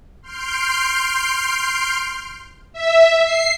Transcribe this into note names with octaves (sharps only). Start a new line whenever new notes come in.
C6 F6 G6 C7 D7
E5
C7